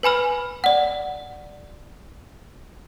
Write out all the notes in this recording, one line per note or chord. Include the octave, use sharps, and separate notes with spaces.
B4 G#5 B5 F6
D5 F#5